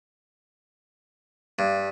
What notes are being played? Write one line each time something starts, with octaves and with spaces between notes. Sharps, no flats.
G2